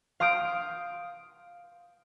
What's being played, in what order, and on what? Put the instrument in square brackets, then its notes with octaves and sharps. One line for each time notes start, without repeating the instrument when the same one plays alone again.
[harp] F5 C6 D#6 G6 D7